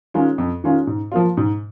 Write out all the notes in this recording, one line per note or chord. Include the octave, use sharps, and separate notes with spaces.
D#3 G#3 C#4 F4
F2
D#3 G#3 C#4 F4
G#2
F3 A#3 F4
G#2